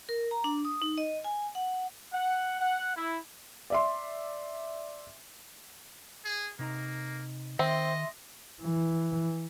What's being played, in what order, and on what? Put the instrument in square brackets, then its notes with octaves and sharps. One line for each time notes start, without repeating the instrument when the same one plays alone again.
[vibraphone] A#4
A#5
D4
D#6
D#4
D#5
G#5
F#5
[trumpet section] F#5
F#5
E4
[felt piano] D5 E5 C6
[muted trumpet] G#4
[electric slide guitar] C3 D#4 A#5 [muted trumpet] A#3
[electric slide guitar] D#3 [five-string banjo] C4 [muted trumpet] D#5 [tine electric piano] E5 C6
[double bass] E3